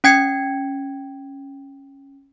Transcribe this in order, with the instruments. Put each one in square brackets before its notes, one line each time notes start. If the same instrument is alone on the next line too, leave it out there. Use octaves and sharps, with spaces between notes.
[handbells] C#4 G5 G#6 C#7